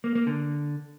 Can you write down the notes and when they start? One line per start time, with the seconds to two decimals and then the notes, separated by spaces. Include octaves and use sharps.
0.04 A#3
0.15 A#3
0.27 D3